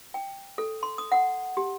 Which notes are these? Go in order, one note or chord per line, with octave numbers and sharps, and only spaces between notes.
G5
A4
C6
D#6
F#5
G4